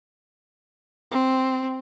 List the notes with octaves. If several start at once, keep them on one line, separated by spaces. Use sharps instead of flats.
C4